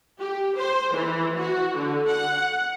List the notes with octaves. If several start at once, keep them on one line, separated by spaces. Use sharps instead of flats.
G4
C5
E3
F#4
D3
F#5